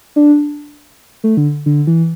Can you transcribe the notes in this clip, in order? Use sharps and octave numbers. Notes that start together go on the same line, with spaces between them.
D4
A3
D3
D3
E3